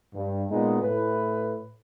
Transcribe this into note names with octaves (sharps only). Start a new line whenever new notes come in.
G2
A#2 G#3 B3 D#4
A2 B4